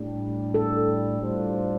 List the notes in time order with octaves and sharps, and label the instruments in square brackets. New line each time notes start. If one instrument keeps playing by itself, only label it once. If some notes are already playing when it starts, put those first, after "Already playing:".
Already playing: [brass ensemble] A2 G3 D4
[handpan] A4
[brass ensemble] A2 G3 D4 F4 C5